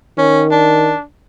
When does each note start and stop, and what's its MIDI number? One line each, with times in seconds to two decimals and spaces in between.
0.18 0.92 51
0.18 0.44 61
0.52 1.03 62